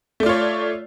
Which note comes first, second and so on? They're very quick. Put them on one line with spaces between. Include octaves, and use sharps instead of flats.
A3 D5 F4 C#5